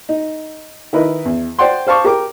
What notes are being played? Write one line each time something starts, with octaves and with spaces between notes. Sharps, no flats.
D#4
D#3 E4 A#4 B4 D#5
E2
C5 D5 F#5 G5 C6
C5 F5 A5 C#6 D6
G4 A#4 D6